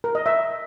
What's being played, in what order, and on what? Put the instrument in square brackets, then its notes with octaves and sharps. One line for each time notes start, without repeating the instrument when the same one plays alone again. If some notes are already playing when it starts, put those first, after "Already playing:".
[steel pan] A#4
D#5
E5